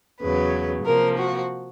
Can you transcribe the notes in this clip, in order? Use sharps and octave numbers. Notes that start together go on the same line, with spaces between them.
E2 C#3 F#3 B4
C3 F3 A#3 A#4
F#4